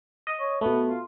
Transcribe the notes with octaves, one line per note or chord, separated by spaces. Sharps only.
D#5
C#5
B2 A3 B3
F4